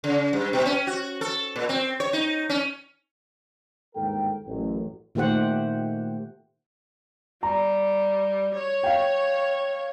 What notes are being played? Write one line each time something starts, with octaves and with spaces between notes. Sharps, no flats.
C#3
G2
B2
C#4
F#4
A4
A#2
C4
C#5
D#4
C#4
G1 D#2 G#2 A4 A#4 G5
A1 F#2
A#2 D#3 A3 G4 C5 F#5
G3 A#5
C#5
F5 G5